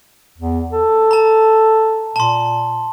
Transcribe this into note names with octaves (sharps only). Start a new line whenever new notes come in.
E2
A4
A5 A#5
A#2 A5 C6